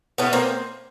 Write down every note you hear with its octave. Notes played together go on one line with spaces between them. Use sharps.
A2 B3 C#4
A#3 C4